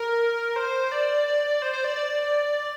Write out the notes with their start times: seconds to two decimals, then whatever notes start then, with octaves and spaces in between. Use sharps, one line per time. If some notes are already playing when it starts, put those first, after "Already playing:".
Already playing: A#4
0.56 C5
0.92 D5
1.62 C5
1.73 C5
1.84 D5
1.96 D5